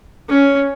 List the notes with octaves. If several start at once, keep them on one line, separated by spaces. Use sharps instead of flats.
C#4